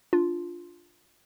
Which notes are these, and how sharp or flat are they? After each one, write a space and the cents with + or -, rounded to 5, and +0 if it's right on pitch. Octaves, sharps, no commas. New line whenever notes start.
D4 +0 F4 +0